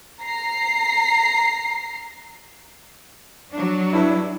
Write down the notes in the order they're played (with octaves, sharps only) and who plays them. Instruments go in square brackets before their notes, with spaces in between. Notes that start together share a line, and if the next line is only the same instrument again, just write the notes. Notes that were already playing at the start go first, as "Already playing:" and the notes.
[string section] A#5 C7
[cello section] F#3 D4
[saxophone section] G2 E4